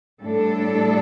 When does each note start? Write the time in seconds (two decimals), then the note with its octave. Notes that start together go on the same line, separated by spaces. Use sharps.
0.24 A2 G3 D4 A4